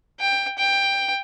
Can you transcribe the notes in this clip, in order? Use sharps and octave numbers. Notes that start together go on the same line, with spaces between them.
G5
G5